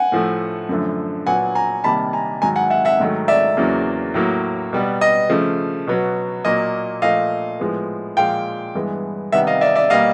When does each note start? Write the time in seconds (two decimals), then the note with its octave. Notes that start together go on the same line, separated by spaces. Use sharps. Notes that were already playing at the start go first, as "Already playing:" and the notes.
Already playing: F#5 G#5
0.12 A2 F3 A3
0.69 F#2 D3 F3 A3
1.26 A#2 F#3 B3 F#5 G#5
1.55 G#5 A#5
1.84 C3 D#3 G3 A#3 A5 B5
2.13 G#5 A#5
2.42 G#2 D#3 F#3 G#5 A#5
2.56 F#5 G#5
2.70 E5 F#5
2.85 E5 F#5
3.00 G#2 D#3 F#3 A3
3.28 D5 E5
3.57 E2 C#3 F#3 A#3
4.14 A2 F#3 A#3
4.73 B2 G3 B3
5.01 D#5
5.29 C#3 F3 A3
5.87 B2 F#3 B3
6.45 A#2 F#3 A#3 D#5
7.02 A#2 F3 A3 D#5 F5
7.60 A2 F3 G#3 B3
8.17 A#2 F3 G#3 F5 G5
8.75 G2 E3 G#3 B3
9.32 C3 D#3 G3 B3 E5 F#5
9.47 D#5 F5
9.61 D5 E5
9.76 D5 E5
9.90 B2 G3 A#3 D#5 F5